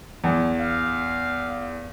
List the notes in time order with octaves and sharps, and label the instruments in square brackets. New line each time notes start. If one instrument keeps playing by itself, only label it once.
[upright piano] E2
[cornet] F5